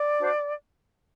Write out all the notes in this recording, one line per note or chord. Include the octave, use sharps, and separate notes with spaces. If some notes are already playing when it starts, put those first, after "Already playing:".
Already playing: D5
D4 F#4 C5